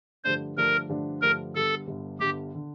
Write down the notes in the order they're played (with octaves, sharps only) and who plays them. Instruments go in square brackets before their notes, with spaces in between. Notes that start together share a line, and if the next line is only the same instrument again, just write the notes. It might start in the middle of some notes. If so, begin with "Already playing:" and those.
[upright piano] G2 D3 F3 A3 D4 [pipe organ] C5
[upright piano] G2 D3 F3 A3 D4 [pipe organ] A#4
[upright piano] G2 D3 F3 A3 D4
[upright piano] G2 D3 F3 A3 D4 [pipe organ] A#4
[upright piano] G1 G2 D3 [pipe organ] A4
[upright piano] G1 G2 D3
[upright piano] G1 G2 D3 [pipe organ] G4
[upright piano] D3